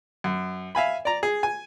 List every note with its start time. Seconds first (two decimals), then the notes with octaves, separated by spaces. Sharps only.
0.24 F#2
0.75 E5 F5 G#5 B5
1.05 D5 A#5
1.23 G#4
1.43 G#5